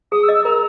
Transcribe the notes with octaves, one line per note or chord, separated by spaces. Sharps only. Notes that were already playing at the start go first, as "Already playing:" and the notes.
G#4 D#6
E6
D#5
E6
A#4 A#5